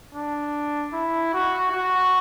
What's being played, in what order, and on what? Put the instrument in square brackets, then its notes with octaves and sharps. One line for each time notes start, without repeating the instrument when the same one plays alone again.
[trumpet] D4
E4
F#4
F#4